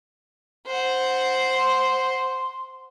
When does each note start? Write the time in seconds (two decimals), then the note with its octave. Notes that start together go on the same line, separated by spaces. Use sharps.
0.67 C5 F#5
1.55 C6